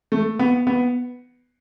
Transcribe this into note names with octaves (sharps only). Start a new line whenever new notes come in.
A3
B3
B3